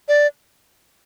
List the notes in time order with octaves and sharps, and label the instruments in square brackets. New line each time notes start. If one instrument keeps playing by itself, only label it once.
[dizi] D5